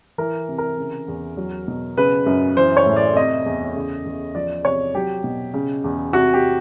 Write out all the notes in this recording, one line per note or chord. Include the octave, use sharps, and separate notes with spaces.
E3 A#4
C3
A#4
C#3
E2
F#3
B2
C#3 B4
F#2
E3 C5
C#5
A2
D5
C3 D#5
E2
C#3
E2
F3 D5
C3 C#5
F#3 G4
B2
C#3
E2
C3 F#4
G4